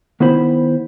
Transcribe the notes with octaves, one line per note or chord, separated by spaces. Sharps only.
D#3 B3 E4 C5 B5